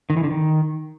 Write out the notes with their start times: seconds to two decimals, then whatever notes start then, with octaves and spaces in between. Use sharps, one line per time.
0.10 D#3
0.17 E3
0.24 D3
0.30 D#3